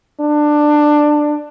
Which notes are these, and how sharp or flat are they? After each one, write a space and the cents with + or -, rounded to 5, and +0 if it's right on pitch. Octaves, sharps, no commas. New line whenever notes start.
D4 +15